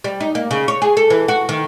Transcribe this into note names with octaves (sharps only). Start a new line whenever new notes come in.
G3
D#4
A#3
C#3
C#5
G#4
A4
E3
F#4
D#3